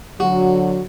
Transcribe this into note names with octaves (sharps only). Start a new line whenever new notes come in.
D3 F#3 F#4